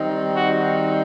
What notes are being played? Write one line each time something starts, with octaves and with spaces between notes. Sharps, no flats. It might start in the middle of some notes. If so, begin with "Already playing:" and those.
Already playing: D#3 G3 C4 D#4
F#4